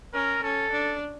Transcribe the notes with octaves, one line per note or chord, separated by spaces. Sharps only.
C#4 A#4
C#4 A4
D4